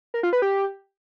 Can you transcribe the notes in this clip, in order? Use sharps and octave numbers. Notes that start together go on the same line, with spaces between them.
A#4
F4
B4
G4